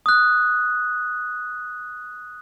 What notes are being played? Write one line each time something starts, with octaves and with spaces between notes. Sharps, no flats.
D#6 F#6